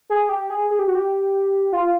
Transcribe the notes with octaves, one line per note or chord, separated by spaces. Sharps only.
G#4
G4
G#4
G#4
G4
F#4
G4
F4